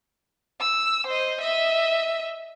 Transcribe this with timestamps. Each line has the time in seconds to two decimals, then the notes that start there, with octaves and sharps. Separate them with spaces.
0.60 E6
1.07 C5 D#5
1.41 D#5 E5